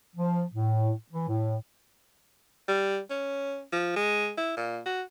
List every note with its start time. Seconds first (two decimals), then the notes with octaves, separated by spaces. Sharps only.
0.16 F3
0.54 A2
1.12 E3
1.29 A2
2.68 G3
3.11 C#4
3.72 F3
3.96 G#3
4.38 E4
4.57 A#2
4.86 F#4